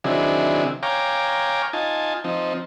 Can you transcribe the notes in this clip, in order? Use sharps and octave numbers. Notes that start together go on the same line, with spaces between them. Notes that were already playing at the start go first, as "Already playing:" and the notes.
C3 D#3 F#3 D4 E4 G#4
C#5 F5 G5 G#5 A#5 D6
D#4 F4 G#5 A5
F3 C4 D#4